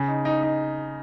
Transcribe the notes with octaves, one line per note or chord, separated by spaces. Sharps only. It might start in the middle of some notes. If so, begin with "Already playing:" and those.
Already playing: C#3
D#4
D#4
D#4